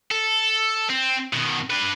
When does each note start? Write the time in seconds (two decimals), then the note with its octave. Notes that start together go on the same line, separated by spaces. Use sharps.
0.11 A4
0.90 C4
1.33 B2 D#3
1.70 D4 B4